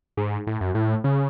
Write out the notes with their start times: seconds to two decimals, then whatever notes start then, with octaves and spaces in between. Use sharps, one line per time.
0.17 G#2
0.47 A2
0.61 F#2
0.75 A2
1.04 C#3